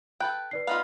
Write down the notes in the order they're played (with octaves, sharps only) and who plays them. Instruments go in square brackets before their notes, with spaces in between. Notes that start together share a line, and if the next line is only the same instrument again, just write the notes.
[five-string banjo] A4 B4 G5 [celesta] F#6
[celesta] B4 D5 C7
[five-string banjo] B3 D#4 F4 [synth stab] F5 B5